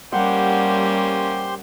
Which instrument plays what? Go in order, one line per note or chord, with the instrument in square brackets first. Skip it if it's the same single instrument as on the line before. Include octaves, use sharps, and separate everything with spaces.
[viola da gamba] G3 [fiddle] A#3 C#4 [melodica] G4 C5 C6 [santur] F#5